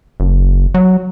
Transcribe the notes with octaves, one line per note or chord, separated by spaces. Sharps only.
F#1
F#3